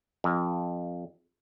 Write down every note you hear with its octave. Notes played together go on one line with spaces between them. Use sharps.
F2